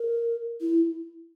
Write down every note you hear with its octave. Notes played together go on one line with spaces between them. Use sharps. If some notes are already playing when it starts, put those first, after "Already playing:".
Already playing: A#4
E4